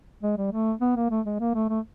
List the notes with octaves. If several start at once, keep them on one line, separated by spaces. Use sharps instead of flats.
G#3
G3
A3
B3
A#3
A3
G#3
A#3
A3
A3